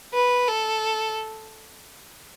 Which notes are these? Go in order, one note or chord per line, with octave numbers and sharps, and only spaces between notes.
B4
A4